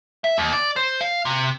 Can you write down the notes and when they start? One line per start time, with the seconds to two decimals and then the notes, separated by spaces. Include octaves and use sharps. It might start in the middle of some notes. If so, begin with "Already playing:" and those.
0.24 E5
0.38 D#2
0.53 D5
0.76 C5
1.01 F5
1.25 C3